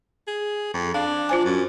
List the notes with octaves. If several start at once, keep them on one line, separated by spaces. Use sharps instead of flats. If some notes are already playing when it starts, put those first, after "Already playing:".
G#4
F2
D4 F5
F4 C5 G#5
F#2